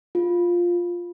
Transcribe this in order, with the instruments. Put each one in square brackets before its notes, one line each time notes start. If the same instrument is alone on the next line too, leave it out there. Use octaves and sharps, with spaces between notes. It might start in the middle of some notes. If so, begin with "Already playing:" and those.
[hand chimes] F4